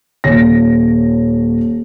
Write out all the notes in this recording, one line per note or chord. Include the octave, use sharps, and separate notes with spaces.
D#1 C#5 A#6